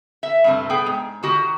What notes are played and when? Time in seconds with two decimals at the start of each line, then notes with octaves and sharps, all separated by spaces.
0.23 E5
0.44 G2 C3 A3
0.70 B3 G#4 G5
0.86 G#2
1.23 D#3 F#4 G4